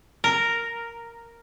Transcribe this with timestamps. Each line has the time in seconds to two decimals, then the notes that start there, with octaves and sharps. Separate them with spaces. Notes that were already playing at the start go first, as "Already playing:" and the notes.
0.24 A#4